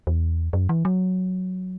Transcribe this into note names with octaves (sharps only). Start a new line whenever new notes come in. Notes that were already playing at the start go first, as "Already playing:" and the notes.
E2
F#2
E3
F#3